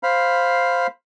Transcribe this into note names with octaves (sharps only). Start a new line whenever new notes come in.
C5 F5 B5